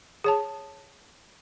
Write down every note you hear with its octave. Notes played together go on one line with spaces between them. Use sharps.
G#4 C#5 A5